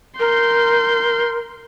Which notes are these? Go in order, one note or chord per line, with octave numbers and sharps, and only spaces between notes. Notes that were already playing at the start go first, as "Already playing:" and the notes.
A#4 C6 G6